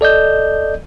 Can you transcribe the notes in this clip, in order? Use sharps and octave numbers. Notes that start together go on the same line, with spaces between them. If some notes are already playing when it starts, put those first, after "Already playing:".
A4 D5 D#5 G6